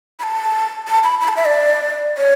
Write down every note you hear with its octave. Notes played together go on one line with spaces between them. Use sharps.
B5
A5
A5
B5
B5
A5
E5
D5
C#5